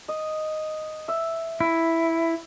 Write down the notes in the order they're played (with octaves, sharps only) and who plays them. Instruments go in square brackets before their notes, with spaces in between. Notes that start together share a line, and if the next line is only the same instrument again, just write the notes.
[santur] D#5
E5
[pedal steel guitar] E4